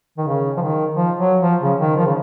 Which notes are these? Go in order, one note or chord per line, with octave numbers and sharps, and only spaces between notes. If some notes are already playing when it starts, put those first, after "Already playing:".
D#3
C#3
F3
D#3
F3
F#3
F3
C#3
D#3
F3
C#3